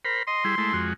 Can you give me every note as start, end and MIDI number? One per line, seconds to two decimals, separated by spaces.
0.05 0.23 70
0.05 0.23 72
0.05 0.23 83
0.27 0.44 75
0.27 0.86 84
0.44 0.55 55
0.44 0.55 64
0.44 0.55 68
0.58 0.73 56
0.58 0.73 57
0.58 0.73 64
0.73 0.93 41
0.73 0.93 56
0.73 0.93 66